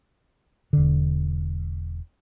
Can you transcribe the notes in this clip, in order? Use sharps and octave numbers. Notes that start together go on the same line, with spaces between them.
E1 D3